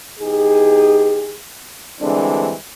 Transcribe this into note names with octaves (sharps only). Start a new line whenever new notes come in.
E2 D#4 G4 G#4
D3 E3 G3 G#3 C4 D4